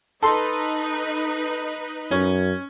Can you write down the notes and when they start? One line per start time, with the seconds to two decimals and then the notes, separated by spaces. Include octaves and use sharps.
0.23 D#4 A4 B4 C6
2.11 F#2 C#4